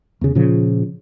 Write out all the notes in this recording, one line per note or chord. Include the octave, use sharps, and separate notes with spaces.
E2 C#3
A#2 C#3 F3